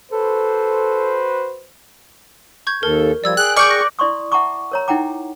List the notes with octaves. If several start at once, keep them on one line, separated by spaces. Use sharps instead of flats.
F#4 A4 B4 C5
C#6 G6 G#6
D#2 A4 A#4
F3 G3 D5 E6 G#6
G#4 G5 F#6
D5 C#6 F6 G6
F#6 A#6
E4 D5 C6 C#6 D#6
E5 F#5 A5 A#5 C#6 D6
A#4 C#5 A#5
D#4 E4 F#5 G5 A#5 D6